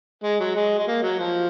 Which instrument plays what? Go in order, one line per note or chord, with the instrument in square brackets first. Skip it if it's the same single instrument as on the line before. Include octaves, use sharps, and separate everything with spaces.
[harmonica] G#3
F#3
G#3
G#3
A#3
F#3
F3